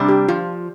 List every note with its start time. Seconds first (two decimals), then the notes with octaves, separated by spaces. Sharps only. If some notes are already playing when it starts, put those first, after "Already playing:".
Already playing: C3 G3 D4
0.09 G4
0.28 F3 F4